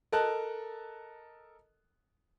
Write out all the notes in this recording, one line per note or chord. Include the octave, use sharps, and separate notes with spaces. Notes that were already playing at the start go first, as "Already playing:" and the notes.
A4 A#4 D#5 A5 F#6